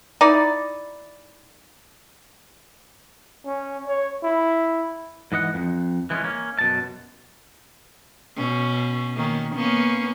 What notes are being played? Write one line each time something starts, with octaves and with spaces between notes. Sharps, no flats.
D#4 E4 D5
C#4
C#5
E4
G#2 E3 D#5 F#5
F2
E3 G#3 B3 C#4
A#3 C#4
F#2 B2 A5
B2 C#4
D#3 A#3 C#4
A#3 B3 C#4